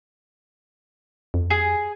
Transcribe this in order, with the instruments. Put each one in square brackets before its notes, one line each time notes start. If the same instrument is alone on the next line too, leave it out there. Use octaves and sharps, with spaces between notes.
[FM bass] F2
[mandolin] G#4